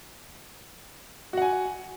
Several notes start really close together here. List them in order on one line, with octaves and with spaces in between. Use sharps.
F#4 F#5 G#5